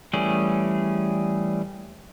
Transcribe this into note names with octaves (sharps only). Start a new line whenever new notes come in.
E3 G3 A3 C#4 G#4